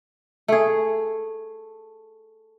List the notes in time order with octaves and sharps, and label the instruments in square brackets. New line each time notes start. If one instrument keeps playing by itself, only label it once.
[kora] A3 G#4